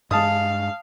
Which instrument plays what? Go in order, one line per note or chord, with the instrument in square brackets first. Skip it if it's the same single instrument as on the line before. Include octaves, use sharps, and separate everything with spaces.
[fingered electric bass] G2 G#3 [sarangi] F5 [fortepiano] A5 D#6